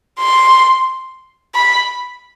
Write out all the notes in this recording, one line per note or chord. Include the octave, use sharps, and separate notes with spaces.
C6
B5